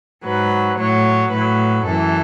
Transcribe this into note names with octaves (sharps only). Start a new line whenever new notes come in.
G#2 F#3 B4
A2 F#3 C#5
A2 F#3 B4
F#2 E3 A4